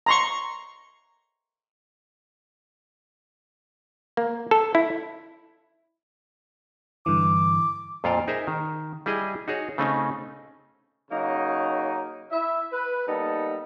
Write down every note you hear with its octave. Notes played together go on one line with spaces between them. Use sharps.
A#5 C6 C#6
A#3
A4
E4
G2 D3 E3 D6
F2 A#2 F4 A4 F5 G5
D#4 G#4 A#4 C5 E5
D#3
G3 E4 G#4 D#5
D#4 F#4 G#4 C#5
C#3 A3 C4 C#4 D#4
C#3 F#3 A#3 D#4
E4 E5
B4
G3 A#3 B3 D#4 A4